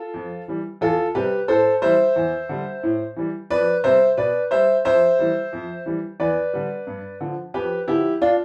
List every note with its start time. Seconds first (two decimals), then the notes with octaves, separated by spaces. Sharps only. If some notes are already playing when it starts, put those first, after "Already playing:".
Already playing: F4 A4
0.14 F2
0.48 E3 G3
0.81 E2 F4 A4
1.15 C3 G3 G4 B4
1.48 A2 A4 C5
1.82 E3 G3 C5 E5
2.16 E2
2.49 D3 G3
2.83 A2
3.16 E3 G3
3.50 F2 B4 D5
3.84 C3 G3 C5 E5
4.17 B2 B4 D5
4.51 G3 C5 E5
4.85 F2 C5 E5
5.19 E3 G3
5.53 F2
5.86 E3 G3
6.20 E2 B4 D5
6.53 D3 G3
6.87 G2
7.21 D3 F3
7.54 F2 G4 B4
7.88 D3 F3 E4 G4
8.22 D4 F4